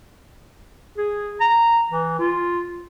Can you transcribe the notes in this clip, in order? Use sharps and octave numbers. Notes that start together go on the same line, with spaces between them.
G#4
A#5
E3
F4